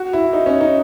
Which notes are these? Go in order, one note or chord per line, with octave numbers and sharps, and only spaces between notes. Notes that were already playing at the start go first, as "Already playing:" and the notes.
Already playing: F#4
E4
D#4
C#4
D#4